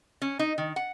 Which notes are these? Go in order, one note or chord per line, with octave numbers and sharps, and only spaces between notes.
C#4
D#4
D#3
F#5